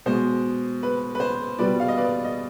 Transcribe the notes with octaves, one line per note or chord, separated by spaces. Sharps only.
B2 G#3 C5
B4
B4
C5
B2 G3 B4 D5
F5
D#5
B4 D5
D#5